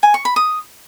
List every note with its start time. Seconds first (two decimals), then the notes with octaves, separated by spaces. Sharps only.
0.03 G#5
0.14 C#6
0.25 B5
0.36 D#6